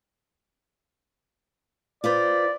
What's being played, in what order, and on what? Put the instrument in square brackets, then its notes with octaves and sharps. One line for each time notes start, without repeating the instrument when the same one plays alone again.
[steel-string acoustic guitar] F4 B4 C5 [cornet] D5